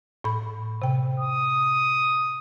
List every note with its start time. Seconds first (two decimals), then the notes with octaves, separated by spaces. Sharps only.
0.24 A2 B5
0.82 C3 G5
1.20 D#6